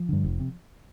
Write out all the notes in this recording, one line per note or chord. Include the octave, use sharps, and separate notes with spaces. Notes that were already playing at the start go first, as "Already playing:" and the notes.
Already playing: F3
G2 D3
F1
C3